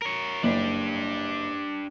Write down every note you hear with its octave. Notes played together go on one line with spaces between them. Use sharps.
A#4 C#5
F#1 D4 G4